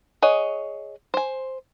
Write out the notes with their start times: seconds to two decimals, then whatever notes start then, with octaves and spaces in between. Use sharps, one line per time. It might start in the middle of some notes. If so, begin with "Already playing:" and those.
0.22 G#4 C#5 D#5 F#5
1.14 C5 G#5